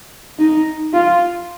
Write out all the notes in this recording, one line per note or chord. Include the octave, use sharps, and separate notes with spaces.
D#4
F4